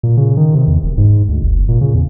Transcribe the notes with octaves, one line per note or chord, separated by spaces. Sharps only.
A#2
C#3
D#3
C3
E2
E1
G#2
D2
F#1
A#2
C#3
E2